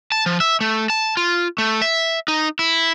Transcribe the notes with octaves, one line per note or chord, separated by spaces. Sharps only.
A5
F3
E5
A3
A5
F4
A3
E5
D#4
E4